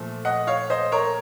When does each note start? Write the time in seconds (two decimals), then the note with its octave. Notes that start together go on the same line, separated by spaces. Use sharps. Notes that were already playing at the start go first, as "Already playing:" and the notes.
Already playing: A#2 F3 A3
0.25 D#5 F#5
0.47 C#5 F5
0.70 C5 D#5
0.92 A#4 C#5